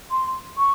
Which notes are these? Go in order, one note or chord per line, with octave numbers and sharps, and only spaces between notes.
C6
C#6